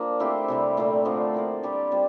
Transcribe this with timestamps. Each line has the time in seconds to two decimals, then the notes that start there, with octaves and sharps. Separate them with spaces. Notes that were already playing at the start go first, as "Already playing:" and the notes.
Already playing: F3 A#3 D4
0.20 A3 C4 E4 G4
0.48 C3 E3 G3
0.77 A#2 A3 C4
1.05 D3 F3 A3
1.34 A#3 E4 A4 D5
1.63 G3 D4 G4 D5
1.92 G3 C4 F4